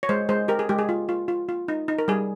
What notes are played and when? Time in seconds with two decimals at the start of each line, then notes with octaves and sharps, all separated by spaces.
0.03 C#5
0.09 G#3 C5
0.29 G#3 C5
0.48 G4 A#4
0.59 G#4
0.69 G#3 G4
0.79 G#4
0.89 F4
1.09 F4
1.28 F4
1.49 F4
1.68 D#4
1.88 D#4
1.99 A#4
2.08 G3 G#4